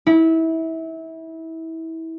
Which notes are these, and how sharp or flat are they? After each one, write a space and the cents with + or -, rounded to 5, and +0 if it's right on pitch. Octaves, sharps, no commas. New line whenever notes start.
E4 -25